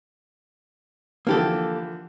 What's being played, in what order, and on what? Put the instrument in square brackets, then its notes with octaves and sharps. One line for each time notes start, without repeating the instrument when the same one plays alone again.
[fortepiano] D3 E3 F3 [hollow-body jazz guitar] A#3 G4 A4